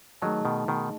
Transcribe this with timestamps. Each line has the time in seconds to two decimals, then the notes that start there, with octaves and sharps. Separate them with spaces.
0.22 D#3 F#3 A3 D#4 G#4 D#5 A5
0.45 B2 D#3
0.68 B2 D#3